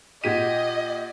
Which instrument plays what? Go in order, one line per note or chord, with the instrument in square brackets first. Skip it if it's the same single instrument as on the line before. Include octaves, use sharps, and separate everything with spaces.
[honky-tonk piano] A#2 G4 D#7 [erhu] D#5 [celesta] F#5 G#6 B6